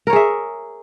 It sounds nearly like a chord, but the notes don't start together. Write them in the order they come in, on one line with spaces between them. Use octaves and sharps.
A#4 C#5 G#4 E5